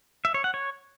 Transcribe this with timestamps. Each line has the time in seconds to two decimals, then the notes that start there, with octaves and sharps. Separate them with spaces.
0.25 E5
0.34 C#5
0.44 F#5
0.54 C#5